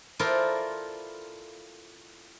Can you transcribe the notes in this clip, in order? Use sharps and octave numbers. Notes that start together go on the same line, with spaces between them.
E4 F4 A4 A#4 C5 D5